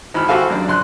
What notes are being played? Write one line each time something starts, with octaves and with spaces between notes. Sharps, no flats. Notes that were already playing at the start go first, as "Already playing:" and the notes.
G#1 E3 B5 F6
F#4 G4 A4 C5 F5 G#5
F#2 D4
A#1 C6 F#6